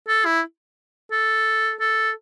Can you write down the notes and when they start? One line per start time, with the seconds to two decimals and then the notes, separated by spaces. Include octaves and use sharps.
0.08 A4
0.25 E4
1.12 A4
1.80 A4